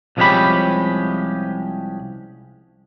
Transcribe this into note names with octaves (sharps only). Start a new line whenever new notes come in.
C2 F3 G#3 C#4 G4 B5